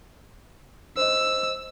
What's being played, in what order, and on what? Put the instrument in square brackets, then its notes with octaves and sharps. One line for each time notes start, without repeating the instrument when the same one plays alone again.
[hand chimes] C5 D#5 [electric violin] E6